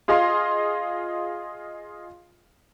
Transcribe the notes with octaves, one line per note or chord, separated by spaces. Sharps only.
F4 G#4 D#5 F5 C6